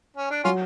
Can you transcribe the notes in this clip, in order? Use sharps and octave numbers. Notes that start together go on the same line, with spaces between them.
C#4
D4
F#3 C#4 F4